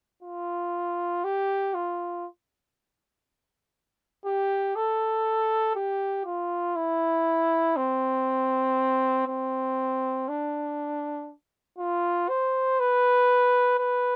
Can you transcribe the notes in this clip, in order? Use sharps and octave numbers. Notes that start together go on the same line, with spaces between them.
F4
G4
F4
G4
A4
G4
F4
E4
C4
C4
D4
F4
C5
B4
B4